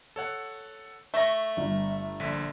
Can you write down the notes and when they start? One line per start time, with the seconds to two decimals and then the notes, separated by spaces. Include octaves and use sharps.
0.16 A4 C#5 F#5
1.14 A3 E5 C#6 A#6
1.57 G1
2.20 A#1 D3 B6